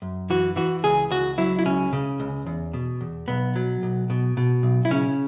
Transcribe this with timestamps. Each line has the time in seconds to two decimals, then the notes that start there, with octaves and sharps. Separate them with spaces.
0.02 F#2
0.30 E3 F#4
0.56 E3 F#4
0.84 C#2 G#4
1.10 C#2 F#4
1.38 F#3 E4
1.59 E4
1.65 C#2 C#4
1.93 C#3
2.20 C#2
2.46 E2
2.73 B2
3.01 E2
3.28 B1 B3
3.56 F#3
3.83 B1
4.10 B2
4.37 B2
4.63 B1
4.85 E4
4.91 C#3 C#4